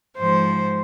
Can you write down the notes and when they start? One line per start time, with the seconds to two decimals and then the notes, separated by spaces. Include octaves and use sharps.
0.16 G#2 F3 C5